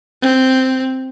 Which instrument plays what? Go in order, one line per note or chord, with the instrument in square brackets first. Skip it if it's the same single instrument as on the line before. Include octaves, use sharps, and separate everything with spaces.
[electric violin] C4